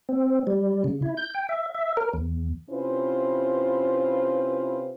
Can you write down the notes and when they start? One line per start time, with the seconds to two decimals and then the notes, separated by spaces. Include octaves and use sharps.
0.09 C4
0.47 G3
0.84 C#3
1.02 E4
1.17 G6
1.34 G5
1.49 E5
1.75 E5
1.97 A#4
2.13 E2
2.70 C3 C#4 E4 F4 B4 C5